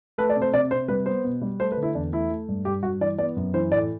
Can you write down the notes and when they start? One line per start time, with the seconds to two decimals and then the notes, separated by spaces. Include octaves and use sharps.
0.18 A3 B4
0.30 D5
0.36 C3
0.42 C5
0.53 C3 D5
0.71 C3 C5
0.88 G3 B4
1.06 B3 C5
1.24 B2
1.42 G3
1.59 A3 C5
1.72 B4
1.77 D3
1.83 E4
1.95 E2 D4
2.12 A3 E4
2.30 A3
2.49 G2
2.65 G2 G4
2.83 G2 F#4
3.01 E3 D5
3.18 B3 D5
3.37 F#2
3.54 E3 C5
3.71 A2 D5